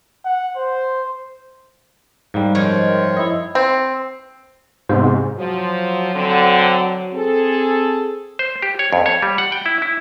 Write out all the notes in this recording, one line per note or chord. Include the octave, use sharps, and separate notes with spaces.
F#5
C5
G#2 G3 A#3
F#2 D#3 F3 C#5
E4 D#5
C4
G#2 C3 B3 C5
F3 F#3
D3 C4
C4 G#4 A4
C5
G4
C#5
F2
C#5
G3
F#5
G5
E4
E4